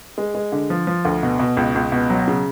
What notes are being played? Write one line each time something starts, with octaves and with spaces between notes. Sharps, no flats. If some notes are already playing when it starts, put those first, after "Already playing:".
G#3
G#3
D3
F3
F3
D2
B2
B2
C#2
C#2
B2
F#3
C#3